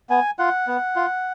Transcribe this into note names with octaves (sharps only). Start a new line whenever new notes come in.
B3 G#5
F4 F#5
B3
F4